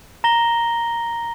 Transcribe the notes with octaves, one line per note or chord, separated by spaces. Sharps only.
A#5 A#6 G7